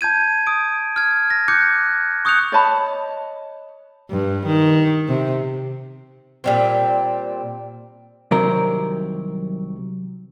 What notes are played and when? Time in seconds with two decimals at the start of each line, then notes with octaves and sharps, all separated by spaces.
0.01 A5 G6 G#6 D#7
0.47 D#6 D7
0.96 F6 G#6
1.30 A#6
1.48 D6 F#6 G6 C#7
2.25 C#6 D#6 F#6 G6 C#7 F7
2.52 C#5 D#5 A5 B5
4.11 G2
4.46 D#3
5.08 C3
6.44 A#2 G3 C4
8.31 C2 C3 D#3 F#3 C4 A#4